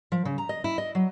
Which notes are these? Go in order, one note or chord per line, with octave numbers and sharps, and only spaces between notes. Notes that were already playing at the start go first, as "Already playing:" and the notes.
F3
C#3
A#5
D#5
E4
D#5
F#3